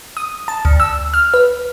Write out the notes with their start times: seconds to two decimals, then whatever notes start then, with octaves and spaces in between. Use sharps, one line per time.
0.17 D#6
0.48 A5
0.65 D2
0.80 E6
1.14 F6
1.34 B4